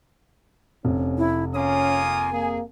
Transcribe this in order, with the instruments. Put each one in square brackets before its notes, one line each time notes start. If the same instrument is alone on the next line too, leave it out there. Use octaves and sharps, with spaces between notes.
[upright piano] F1 C3 [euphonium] C#4
[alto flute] E4
[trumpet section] A#3 F4 D#6 [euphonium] C#4 [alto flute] G#5
[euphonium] A#3 [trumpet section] G#4